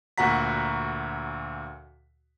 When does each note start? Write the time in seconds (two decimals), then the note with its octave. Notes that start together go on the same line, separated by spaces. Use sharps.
0.18 D2 A#2 F#4 F#5 A#5 B6